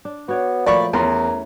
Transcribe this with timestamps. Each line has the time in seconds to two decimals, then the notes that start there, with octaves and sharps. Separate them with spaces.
0.05 D4
0.29 B3 F#4 C#5 D5
0.66 A#2 F3 A3 D5 B5 C#6
0.93 E2 E3 A3 C#4 A#4 C6